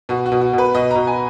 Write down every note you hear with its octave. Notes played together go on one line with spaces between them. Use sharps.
B2 F#4
F#4
B2
F#4
B2
B4
B2 D#5
B2 A#5
G#5